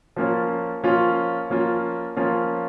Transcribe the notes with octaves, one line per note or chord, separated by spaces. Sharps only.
F3 A#3 C#4 F4
F3 A#3 C#4 F4
F3 A#3 C#4 F4
F3 A#3 C#4 F4